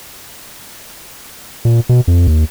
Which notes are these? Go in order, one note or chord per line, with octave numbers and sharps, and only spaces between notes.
A#2
B2
F2
D#2